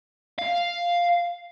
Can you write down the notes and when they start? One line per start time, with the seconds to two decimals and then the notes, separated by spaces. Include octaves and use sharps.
0.38 F5